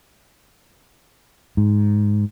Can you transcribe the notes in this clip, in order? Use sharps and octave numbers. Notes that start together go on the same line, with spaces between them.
G#2